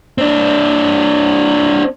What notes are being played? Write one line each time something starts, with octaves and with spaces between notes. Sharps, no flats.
C4 D4